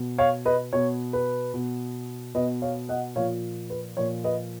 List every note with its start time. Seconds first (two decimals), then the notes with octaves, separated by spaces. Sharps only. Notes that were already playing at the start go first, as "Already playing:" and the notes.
Already playing: B2
0.18 C#5 F5
0.45 B4 D#5
0.73 B2 C#5
1.13 B4
1.54 B2
2.35 B2 B4 D#5
2.62 C#5 F5
2.89 D#5 F#5
3.16 A#2 F3 C#5 F5
3.70 B4
3.97 A#2 F3 C#5
4.24 B4 D#5